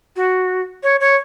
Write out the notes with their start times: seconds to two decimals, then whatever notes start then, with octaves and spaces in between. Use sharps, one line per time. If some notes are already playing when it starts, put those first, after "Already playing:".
0.16 F#4
0.83 C#5
1.00 C#5